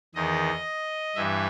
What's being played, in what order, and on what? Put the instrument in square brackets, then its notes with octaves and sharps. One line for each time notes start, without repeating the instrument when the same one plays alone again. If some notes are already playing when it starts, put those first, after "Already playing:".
[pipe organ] E2 D#3 D#5
G2 E3 E5